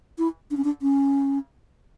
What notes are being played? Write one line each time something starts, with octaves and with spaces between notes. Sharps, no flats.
E4
D4
C#4
D4
C#4